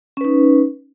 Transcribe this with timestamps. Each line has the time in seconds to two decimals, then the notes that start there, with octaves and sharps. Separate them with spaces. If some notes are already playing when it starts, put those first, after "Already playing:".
0.17 C#4
0.21 B4
0.25 D#4